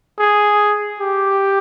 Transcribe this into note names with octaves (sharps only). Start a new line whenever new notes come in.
G#4
G4